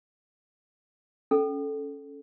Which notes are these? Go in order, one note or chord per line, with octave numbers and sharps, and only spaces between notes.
C#4 A4